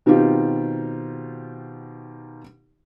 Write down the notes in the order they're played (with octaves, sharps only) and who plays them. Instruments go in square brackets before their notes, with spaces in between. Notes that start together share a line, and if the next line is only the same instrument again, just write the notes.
[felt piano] B2 D#3 C4 D#4 F4 G4